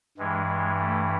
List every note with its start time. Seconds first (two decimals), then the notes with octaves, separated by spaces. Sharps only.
0.18 G2 E3 G#3
0.48 G#3
0.79 A3